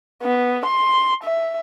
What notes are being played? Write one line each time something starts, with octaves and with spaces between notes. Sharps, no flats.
B3
C6
E5